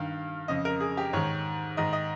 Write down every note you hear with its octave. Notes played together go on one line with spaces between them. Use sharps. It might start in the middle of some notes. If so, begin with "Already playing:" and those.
Already playing: G2 D#3 F5
F2 C#3 D#5
A#4
G#4
G4
G#2 D#3 C#5
G#2 D#3 D#5
D#5